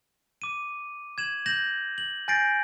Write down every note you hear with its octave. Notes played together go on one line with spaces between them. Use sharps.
D6 D#7
G#6 E7 F#7
G6 A#6 E7 F#7
F#7
G#5 G6 A6 A#6 C7 D7